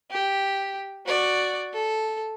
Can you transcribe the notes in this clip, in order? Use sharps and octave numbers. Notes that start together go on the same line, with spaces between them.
G4
F#4 D5
A4